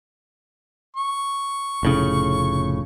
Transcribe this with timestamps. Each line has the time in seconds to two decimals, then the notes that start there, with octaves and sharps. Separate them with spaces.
0.97 C#6
1.83 F1 A2 C#3